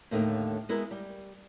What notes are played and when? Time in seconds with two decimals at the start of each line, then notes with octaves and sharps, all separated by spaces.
0.11 D#2 A2 D3 A3 A#3 D#4
0.69 G#3 B3 E4 A#4
0.91 G3